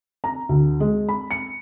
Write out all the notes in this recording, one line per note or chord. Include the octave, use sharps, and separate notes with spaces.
A#5
D2
G#3
B5
C#7